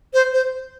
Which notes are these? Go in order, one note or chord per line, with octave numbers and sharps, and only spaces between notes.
C5
C5